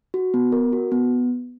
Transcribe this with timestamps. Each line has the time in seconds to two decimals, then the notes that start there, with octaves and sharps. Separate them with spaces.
0.14 F#4
0.34 B3
0.52 A#4
0.72 F#4
0.92 B3